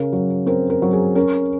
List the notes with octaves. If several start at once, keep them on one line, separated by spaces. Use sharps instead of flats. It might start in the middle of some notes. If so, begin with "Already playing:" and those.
Already playing: C#3 A#4
F#3
C4 A#4
A#4
F#3
G#4
C#4 A#4